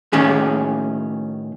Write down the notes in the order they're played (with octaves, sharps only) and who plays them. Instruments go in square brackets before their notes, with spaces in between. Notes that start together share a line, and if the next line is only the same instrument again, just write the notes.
[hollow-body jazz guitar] A2 D#3 C#4 G#4